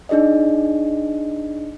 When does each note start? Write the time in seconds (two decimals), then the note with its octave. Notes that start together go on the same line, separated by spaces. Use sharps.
0.09 D4 D#4 G#4 D5 D#5